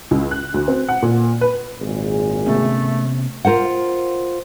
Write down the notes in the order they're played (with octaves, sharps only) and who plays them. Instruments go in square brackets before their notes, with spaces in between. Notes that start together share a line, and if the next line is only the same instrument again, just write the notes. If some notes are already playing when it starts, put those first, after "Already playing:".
[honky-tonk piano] C#2
F#6
D2
C4
F#5
A#2
B4
[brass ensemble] G#1 A#2 G#4
[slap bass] C3 B3 C#4 [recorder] A3
[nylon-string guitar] F4 A#4 C5 F#5